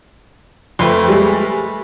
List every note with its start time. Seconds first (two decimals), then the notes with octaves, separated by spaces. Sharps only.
0.79 F2 A3 B4 C6
1.08 G3 G#3